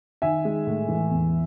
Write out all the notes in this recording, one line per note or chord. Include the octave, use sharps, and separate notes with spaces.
D#3 E5 G#5
G#3
A2
E3
E2